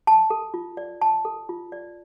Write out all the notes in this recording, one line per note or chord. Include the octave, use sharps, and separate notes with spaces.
A5
A4
F4
D5
A5
A4
F4
D5